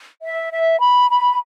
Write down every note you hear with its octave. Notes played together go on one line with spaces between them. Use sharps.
E5
E5
B5
B5